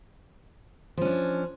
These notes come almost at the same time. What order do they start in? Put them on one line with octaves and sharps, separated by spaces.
F3 C#4 D4